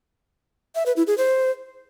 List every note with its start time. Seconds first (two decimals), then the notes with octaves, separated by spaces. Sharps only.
0.75 E5
0.86 B4
0.96 E4
1.07 G#4
1.18 C5